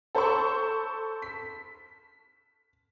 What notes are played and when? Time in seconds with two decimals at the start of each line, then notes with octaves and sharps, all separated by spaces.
0.15 A4 C5 A5 B5 C#6 E6
1.22 B6